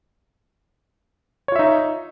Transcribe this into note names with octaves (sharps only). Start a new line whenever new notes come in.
D#4 F4 C#5 E5